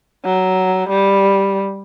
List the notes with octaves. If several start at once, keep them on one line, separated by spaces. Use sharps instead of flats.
F#3
G3